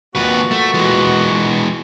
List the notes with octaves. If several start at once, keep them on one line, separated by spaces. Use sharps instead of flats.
D#2 A#2 B3 F#4 B4
A3
E3 G#3